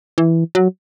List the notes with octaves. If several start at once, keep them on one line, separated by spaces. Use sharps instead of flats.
E3
F#3